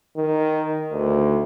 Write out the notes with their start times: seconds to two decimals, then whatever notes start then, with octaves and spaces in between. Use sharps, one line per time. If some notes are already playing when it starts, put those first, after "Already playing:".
0.17 D#3
0.92 D2